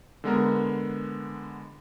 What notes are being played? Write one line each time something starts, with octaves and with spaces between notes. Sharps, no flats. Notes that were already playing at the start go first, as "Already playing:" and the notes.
D3 G#3 B3 A#4